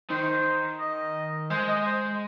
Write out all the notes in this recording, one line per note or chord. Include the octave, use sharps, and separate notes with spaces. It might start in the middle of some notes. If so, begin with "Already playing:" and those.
D#3 C5
D#5
G#3 C5
D#5
C5